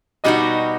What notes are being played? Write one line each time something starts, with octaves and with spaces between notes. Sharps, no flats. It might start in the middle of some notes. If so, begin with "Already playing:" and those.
B2 G3 D#4 F#4 D#5